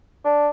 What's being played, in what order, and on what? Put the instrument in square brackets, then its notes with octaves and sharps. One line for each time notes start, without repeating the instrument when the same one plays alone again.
[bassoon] D4